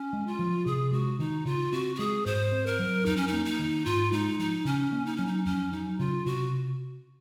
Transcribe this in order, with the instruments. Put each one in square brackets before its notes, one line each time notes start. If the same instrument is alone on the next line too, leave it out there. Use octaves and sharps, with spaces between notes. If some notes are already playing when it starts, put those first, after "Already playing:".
Already playing: [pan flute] C#4
[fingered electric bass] G#3
[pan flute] F4
[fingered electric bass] F3
[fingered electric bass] C3 [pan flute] G#4
[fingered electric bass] G#3 [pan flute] F#4
[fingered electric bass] D#3 [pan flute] D#4
[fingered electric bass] C#3 [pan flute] F4
[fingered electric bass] C4 [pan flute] F#4
[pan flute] F#4
[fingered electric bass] G#3 [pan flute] G#4
[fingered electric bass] G#2 [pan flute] C5
[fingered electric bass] C4
[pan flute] A#4
[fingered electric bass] F#3
[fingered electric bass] F2 [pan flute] D#4
[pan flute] C#4
D#4
[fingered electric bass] A#3
[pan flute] D#4
[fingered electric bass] D#3
[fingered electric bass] G#2 [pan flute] F4
[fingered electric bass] G#3 [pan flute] D#4
[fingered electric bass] F3 [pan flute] D#4
[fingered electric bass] C#3 [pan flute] C#4
[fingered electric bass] A#3
[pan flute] D#4
[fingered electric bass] F#3 [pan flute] C#4
[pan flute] D#4
[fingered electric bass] F2 [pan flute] C#4
[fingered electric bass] F#3 [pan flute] D#4
[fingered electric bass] C#3 [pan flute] F4
[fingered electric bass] C3 [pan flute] F#4